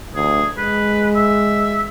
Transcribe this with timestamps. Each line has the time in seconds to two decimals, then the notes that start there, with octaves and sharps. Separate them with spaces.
0.15 D2 G#4
0.58 G#3 B4
1.16 E5